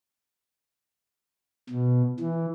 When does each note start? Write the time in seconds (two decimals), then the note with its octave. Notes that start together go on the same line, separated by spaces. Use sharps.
1.69 B2
2.20 E3